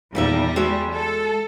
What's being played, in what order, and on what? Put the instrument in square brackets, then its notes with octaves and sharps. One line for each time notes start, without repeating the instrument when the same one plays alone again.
[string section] E2 G3 [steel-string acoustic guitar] A#2 D#3 E5
[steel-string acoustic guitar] G#3 F#4 E5
[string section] A4